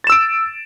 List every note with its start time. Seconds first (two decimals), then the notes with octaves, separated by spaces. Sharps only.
0.04 A6
0.07 E7
0.10 E6
0.12 D7